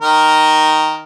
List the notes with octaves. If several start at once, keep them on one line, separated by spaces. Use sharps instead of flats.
D#3 A#4